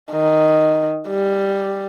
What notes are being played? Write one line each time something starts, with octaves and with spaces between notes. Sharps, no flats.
D#3
G3